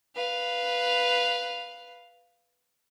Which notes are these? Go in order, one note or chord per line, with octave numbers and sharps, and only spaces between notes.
B4 F5